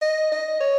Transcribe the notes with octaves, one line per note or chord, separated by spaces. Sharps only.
D#5
D#5
C#5